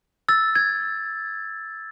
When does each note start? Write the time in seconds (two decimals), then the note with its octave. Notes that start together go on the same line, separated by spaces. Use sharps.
0.29 E6 A6
0.55 G#6